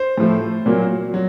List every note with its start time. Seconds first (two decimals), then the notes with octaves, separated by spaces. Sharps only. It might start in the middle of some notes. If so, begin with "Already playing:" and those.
Already playing: C5
0.18 A2 F3 A3
0.66 A#2 F#3 A#3
1.14 F#3